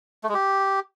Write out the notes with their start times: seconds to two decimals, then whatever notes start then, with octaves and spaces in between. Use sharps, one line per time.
0.24 A3
0.29 G#3
0.34 G4